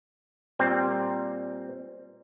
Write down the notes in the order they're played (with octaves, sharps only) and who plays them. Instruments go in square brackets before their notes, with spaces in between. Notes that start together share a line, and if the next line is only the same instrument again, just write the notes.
[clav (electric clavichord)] A#2 G3 C4